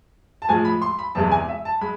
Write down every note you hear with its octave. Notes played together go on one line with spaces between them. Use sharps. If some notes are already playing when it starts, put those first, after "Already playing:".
A5
A2 F3 G#3 G#5
B5
C6
B5
E2 C3 G#3 A5
G#5
E5
A5
G#3 B5